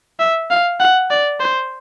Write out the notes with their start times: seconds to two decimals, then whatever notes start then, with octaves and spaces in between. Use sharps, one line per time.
0.19 E5
0.50 F5
0.80 F#5
1.10 D5
1.40 C5